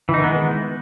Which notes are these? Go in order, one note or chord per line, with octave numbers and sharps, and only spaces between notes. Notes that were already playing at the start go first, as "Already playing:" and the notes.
D#3 E3 G#3 B3 D#4